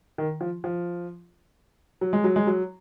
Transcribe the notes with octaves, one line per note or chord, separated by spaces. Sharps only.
D#3
F3
F3
F#3
G#3
F#3
G#3
F#3